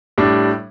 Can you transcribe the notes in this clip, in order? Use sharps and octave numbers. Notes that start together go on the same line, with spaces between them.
A2 G3 D4